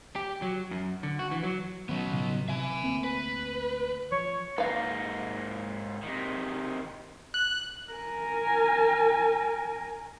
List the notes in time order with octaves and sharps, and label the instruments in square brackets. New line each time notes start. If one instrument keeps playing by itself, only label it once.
[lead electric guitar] G4
F#3
F#2
D3
F#4
E3
F#3
[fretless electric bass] D#3 C#4 [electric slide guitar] F#3 B3
[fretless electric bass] A2 C#3 F3
[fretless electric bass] C3 F#3 [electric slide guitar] E5 G#5
[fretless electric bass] D2 A#3 C4
[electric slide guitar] B4
[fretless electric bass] F3 [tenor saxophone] C#5
[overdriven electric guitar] G#2 A#3 [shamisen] B4 F5
[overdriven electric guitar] C3 D#3
[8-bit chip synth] F#6
[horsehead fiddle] A#4 G#5